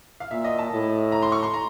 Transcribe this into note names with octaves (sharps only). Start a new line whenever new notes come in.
F5
A#2 E5
D#5
A5
A2
A#5
C6
C#6
C6
A#5